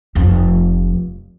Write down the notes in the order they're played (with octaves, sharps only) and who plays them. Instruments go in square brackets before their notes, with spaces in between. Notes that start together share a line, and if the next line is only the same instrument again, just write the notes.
[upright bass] F1 F2